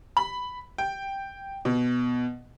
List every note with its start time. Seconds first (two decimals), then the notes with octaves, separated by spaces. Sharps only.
0.17 B5
0.78 G5
1.65 B2